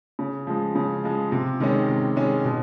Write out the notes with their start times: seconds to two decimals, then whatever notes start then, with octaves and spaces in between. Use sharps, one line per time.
0.19 C#3
0.47 F3 G#3
0.75 C#3
1.04 F3 G#3
1.32 C3
1.60 D#3 G#3 C#4
1.89 C3
2.16 D#3 G#3 C#4
2.44 B2